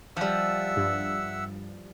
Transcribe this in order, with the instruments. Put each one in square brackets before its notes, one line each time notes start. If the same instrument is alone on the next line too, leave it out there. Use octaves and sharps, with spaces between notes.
[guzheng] F3 G3 [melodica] E5 F#5 E6
[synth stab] G2